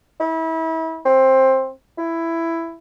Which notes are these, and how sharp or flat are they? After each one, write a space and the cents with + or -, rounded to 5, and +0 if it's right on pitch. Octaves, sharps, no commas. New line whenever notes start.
E4 -30
C4 +15
E4 +10